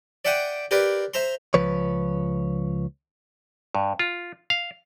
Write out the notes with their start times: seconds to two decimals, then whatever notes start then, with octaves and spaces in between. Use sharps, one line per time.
0.25 D5 E5 F#5 G5 D6 D#6
0.71 G4 A#4 B4 D5 C6
1.14 C5 E5 A#5 C6
1.54 C#2 F3 B4 C#5
3.75 G2
3.99 F4
4.50 F5